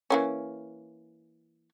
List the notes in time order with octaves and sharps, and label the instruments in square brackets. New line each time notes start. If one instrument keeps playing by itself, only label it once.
[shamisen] E3 A#3 C#4